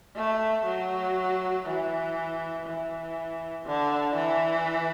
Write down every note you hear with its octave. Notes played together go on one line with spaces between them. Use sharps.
A3
F#3
E3
E3
D3
E3